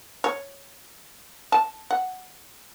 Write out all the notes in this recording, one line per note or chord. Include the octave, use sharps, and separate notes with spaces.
C#5
A5
F#5